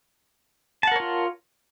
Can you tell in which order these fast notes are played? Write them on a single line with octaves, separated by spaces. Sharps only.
A5 F#5 A#4 C#5 F4